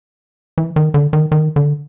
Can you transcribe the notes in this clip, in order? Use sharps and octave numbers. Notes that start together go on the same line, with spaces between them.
E3
D#3
D3
D#3
D#3
D3